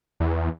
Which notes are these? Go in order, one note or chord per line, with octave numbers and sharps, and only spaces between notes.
E2